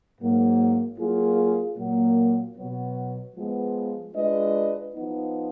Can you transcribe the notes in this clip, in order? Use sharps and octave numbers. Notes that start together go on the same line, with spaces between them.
G#2 F#3 A#3
F#3 A#3 F4 G#4
A#2 F#3 A#3
B2 F#3 B3
F3 G#3 B3
G#3 D4 F4 B4 D#5
F3 B3 D#4